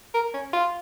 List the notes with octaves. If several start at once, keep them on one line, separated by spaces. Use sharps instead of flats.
A#4
C#4
F4